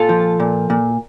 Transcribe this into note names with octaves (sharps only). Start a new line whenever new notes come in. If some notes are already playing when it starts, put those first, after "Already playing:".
Already playing: A#2 F4 A4
F3
A#2
A#2